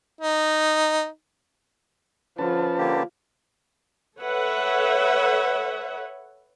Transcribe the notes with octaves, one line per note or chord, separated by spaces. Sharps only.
D#4
D3 F3 C#4 B4 A5
D3 A#3 G4
A4 B4 C#5 E5 F#5